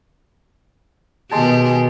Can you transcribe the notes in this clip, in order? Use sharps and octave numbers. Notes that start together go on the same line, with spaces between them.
B2 D#3 G#3 G4 A5